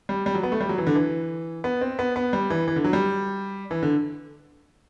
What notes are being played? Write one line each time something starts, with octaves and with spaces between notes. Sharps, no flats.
G3
G3
F#3
B3
A3
G3
F#3
E3
D3
E3
B3
C4
B3
B3
G3
E3
E3
D3
F#3
G3
E3
D3